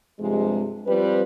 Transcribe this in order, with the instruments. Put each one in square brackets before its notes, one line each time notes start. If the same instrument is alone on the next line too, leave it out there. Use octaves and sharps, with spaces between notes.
[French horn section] G2 C3 F3 G#3
F3 G3 C4 B4